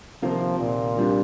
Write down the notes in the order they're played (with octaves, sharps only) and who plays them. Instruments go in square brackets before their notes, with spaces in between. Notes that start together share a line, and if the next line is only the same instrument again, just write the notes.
[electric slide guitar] C3 D#3 A#3 F4 [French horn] F3
[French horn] A#2
[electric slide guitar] C3 G3 D4 F4